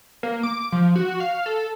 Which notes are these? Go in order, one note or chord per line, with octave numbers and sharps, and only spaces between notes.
A#3
D6
F3
F#4
F5
A4